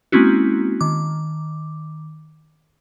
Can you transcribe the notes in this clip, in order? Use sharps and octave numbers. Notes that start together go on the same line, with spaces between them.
G#3 A#3 C4 C#4 E4 F#4
D#3 D6